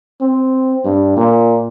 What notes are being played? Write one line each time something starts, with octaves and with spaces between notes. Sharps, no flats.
C4
G2
A#2